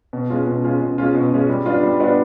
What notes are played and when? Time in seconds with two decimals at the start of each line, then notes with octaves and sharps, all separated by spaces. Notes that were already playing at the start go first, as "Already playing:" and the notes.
0.13 B2
0.30 G#3 C#4 F4
0.47 B2
0.64 G#3 C#4 F4
0.81 B2
0.98 G#3 C#4 F4
1.15 B2
1.32 G#3 C#4 F4
1.49 G3
1.66 B3 D4 F4
1.83 G3
2.00 B3 D4 F4